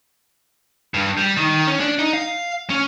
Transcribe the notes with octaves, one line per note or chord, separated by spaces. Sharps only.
G2
G3
D#3
C#4
D4
D#4
F5
C#4